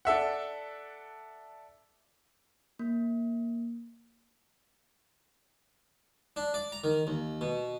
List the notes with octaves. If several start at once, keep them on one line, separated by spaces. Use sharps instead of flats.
D4 A4 E5 F#5
A#3
D4
D5
A#5
D#3
D#2
B2